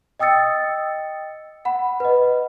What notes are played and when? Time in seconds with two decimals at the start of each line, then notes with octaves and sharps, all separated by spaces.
0.19 D#5 G5 D#6 E6 A6 C#7
1.65 F#5 B5
2.00 B4 D#5